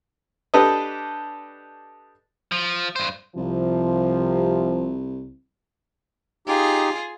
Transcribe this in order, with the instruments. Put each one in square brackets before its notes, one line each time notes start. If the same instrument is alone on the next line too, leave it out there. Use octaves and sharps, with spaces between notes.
[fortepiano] D4 G4 A4 B4 D#5
[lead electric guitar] F3
G2 C5
[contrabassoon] C2 [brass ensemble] C3 F3
[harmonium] D#4 G4 [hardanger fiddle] F4 G#4